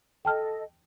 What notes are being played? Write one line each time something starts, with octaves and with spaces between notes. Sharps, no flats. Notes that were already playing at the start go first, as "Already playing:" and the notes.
A4 D#5 G5 A5 F6